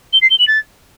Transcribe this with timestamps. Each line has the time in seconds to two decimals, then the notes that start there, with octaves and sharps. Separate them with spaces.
0.13 G7
0.22 C7
0.30 G7
0.39 F#7
0.48 A6